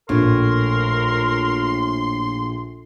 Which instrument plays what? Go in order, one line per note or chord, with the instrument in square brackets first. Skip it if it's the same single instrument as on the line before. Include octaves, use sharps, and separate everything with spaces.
[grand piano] A#1 [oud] A2 [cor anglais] A#4 [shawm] C6